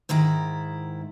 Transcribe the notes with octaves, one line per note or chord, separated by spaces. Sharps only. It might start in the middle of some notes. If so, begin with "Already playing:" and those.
G#2 D#3 E4 A#5